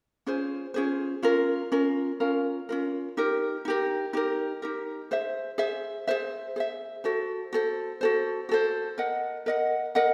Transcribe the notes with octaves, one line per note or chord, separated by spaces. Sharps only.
C#4 F4 G#4 C5
C#4 F4 G#4 C5
C#4 F4 A#4
C#4 F4 A#4
C#4 F4 A#4
C#4 F4 A#4
D#4 G4 A#4
D#4 G4 A#4
D#4 G4 A#4
D#4 G4 A#4
G#4 C5 E5
G#4 C5 E5
G#4 C5 E5
G#4 C5 E5
F#4 A4 C5
F#4 A4 C5
F#4 A4 C5
F#4 A4 C5
A#4 D#5 F#5
A#4 D#5 F#5
A#4 D#5 F#5